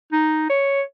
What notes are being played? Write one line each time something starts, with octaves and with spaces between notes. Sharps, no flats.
D#4
C#5